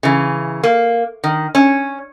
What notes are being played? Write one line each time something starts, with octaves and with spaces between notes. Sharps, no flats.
C#3 E3
A#3
D#3
C#4